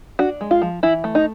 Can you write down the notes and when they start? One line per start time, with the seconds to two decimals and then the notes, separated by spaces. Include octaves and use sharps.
0.19 D4 F#4
0.41 G#3
0.51 F4
0.62 F3
0.83 E3 E4
1.04 A3
1.15 D#4